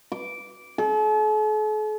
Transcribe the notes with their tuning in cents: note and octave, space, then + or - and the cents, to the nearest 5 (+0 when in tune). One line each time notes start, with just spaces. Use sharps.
D6 -10
A4 -45